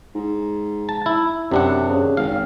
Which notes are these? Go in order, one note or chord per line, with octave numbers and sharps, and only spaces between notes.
G#2
A5
E4
F#2 C3 D4 F#5
C#3
G#1 F5